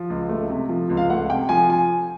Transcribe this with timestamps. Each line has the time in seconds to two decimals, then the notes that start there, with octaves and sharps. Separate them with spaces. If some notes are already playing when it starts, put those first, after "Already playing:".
Already playing: F3
0.10 C#2
0.29 A3
0.50 C3
0.69 F3
0.90 C#2
0.97 F5
1.10 A3 F#5
1.29 C3 G5
1.49 F3 G#5
1.70 G#5